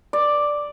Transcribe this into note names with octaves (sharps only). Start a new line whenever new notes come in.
D5